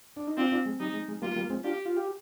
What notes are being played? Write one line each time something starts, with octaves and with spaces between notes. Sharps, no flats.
D4
D#4
C4 D4 F4
D4 F4
G#3
G3 D#4
G#3
G#3
G3 A#3 F4
G3 A#3
G#3 C4
D4 F4 G4
F4
G4